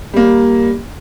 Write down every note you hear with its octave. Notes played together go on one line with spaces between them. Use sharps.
G3 A#3